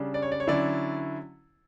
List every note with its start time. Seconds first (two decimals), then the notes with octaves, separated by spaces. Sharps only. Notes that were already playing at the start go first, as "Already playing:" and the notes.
Already playing: C#3 G3 D4
0.14 D5
0.22 C#5
0.32 D5
0.40 C#5
0.47 D3 F#3 C#4 E4 D5